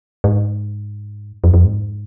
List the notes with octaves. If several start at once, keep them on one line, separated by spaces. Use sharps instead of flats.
G#2
F2
F2
G#2